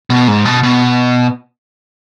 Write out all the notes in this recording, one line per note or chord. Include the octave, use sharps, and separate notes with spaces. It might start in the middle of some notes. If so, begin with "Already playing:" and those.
B2
G#2
B2
B2